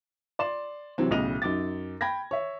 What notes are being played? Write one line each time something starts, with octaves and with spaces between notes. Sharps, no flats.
D5 C6 E7
C3 E3 F#3 C4
B1 A2 C#3 D#5 D#7 F7
F#2 D#4 D6 A6
G5 B5 G#6 A#6
C#5 E5